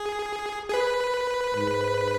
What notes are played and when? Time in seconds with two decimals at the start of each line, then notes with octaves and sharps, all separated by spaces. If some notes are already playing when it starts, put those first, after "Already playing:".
Already playing: G#4
0.68 G#4
0.74 B4
1.55 G#2